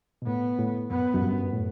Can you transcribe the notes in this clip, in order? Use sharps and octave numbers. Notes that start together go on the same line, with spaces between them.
B2
A2 B3
A2
F#2 B3
F#2
G2
A2